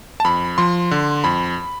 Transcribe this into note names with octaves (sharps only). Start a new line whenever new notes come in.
A5
F2 B5
F3 C6
D3
F2 B5